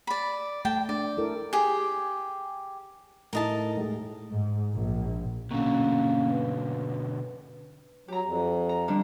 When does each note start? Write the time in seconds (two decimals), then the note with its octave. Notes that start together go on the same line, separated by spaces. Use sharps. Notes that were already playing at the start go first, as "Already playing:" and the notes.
0.07 D5 B5
0.65 A3 G5 A5
0.89 D4 D5
1.18 E4 A4 A#4
1.53 G4 G#4
3.33 A2 D#4 E4 A#4 D#5 A5
3.77 A2 G#3
4.32 G#2
4.73 A#1
5.51 B2 D3 F#3 A#3 C#4 F5
6.31 B4
8.08 F#3 G4 A#5
8.25 F2
8.69 A#5
8.88 D3 G3 D4